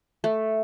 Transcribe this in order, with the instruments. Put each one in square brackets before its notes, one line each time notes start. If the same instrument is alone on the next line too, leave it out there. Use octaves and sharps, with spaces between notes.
[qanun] A3